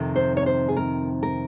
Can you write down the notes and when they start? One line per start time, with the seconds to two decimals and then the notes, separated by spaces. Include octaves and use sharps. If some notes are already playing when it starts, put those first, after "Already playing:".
Already playing: F2 C3 D#3
0.16 C5
0.37 C#5
0.46 C5
0.68 G#4
0.77 A#4
1.23 A#4